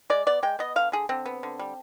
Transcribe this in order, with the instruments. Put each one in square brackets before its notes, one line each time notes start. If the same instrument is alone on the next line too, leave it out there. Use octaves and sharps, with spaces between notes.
[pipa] G#3 D5
B3 D5
G#3 G5
B3 D#5
D3 F5
D3 G#4
D3 C4
B3
D3
G3